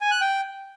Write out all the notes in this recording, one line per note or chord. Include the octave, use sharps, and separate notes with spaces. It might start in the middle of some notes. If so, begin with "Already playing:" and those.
G#5
F#6
G5